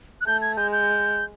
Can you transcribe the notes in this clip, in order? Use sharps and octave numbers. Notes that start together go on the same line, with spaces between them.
F#6
A3 G6
G#6
G#3 G6
G6